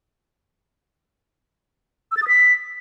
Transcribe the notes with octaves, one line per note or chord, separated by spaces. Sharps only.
E6
A6
D#6
B6